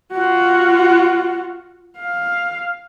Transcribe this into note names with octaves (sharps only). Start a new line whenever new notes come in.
F4 F#4
F5